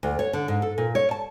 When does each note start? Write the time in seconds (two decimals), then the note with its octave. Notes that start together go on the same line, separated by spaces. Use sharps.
0.03 D2
0.19 C#5
0.33 D3
0.48 G#2
0.62 A4
0.78 A#2
0.95 C#5
1.11 A5